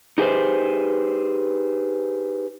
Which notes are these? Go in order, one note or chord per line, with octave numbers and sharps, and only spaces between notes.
D#4 G4 G#4 B4 C5